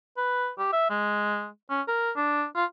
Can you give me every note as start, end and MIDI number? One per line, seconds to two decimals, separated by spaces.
0.18 0.50 71
0.59 0.69 67
0.73 0.90 76
0.90 1.48 56
1.70 1.81 61
1.88 2.11 70
2.16 2.45 62
2.56 2.65 65